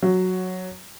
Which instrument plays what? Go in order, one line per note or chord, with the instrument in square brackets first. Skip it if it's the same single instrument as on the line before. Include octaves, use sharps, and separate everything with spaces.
[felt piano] F#3